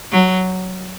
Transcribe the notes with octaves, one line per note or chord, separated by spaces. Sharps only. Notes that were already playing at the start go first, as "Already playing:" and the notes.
F#3